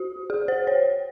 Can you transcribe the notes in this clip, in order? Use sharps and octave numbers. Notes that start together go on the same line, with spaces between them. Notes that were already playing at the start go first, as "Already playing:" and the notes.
Already playing: F#4
G#4
C5
C#5